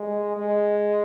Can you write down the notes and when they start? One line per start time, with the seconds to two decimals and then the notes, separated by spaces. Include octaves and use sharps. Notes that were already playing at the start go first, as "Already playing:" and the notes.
Already playing: G#3
0.37 G#3